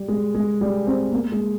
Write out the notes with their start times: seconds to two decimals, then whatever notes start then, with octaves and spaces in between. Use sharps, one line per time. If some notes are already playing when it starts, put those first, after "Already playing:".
Already playing: G3
0.08 G#3
0.35 G#3
0.61 G3
0.87 C4
1.12 A#3
1.32 G#3